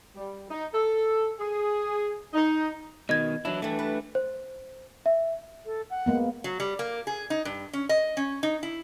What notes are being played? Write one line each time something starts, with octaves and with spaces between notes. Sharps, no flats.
G3
D#4
A4
G#4
D#4
B2 D#3 D#5 G#6
E3 F#3 D4 E4
E3 G3 A3
B4
C5
E5
A4
F#5
G#3 A#3 B3
F#3
G3
A#3
G#4
D#4
G2
C#4
D#5
C#4
D#4
E4